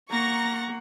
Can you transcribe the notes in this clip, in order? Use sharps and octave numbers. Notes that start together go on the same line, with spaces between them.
A#3 F#5 A#5 C#6 A#6